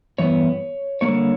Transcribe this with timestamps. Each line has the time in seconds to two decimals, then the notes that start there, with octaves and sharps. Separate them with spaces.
0.18 G2 E3 B3 C#5
1.01 D3 G3 A#3 C#5